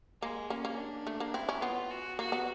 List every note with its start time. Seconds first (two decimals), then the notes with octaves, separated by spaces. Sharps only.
0.22 G#3 A#3
0.50 A#3 C#4
0.65 A#3
0.78 D4
1.07 A3
1.20 A#3
1.34 C4 E4
1.49 C#4
1.62 B3 F4
1.91 F#4
2.19 A#3 F#4
2.32 B3